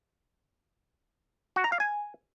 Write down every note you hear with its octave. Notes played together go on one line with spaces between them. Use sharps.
F#4
A#5
F5
G#5